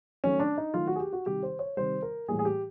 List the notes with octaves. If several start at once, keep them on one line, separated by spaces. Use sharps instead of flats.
D#3 F#3 A3 C#4
D4
D#4
D#3 F#3 A3 F4
F#4
G#4
G4
F#4
C3 D#3 G3 G4
C5
C#5
C3 D#3 G3 C5
A#4
A2 E3 G3 A#3 G#4
G#4
G4